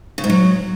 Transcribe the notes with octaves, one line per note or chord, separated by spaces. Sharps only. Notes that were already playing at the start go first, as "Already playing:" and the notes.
C#3
G#2
F#3